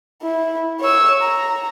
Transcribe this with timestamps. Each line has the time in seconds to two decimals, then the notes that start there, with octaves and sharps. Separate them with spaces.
0.22 E4
0.81 C#5 E6
1.22 A#5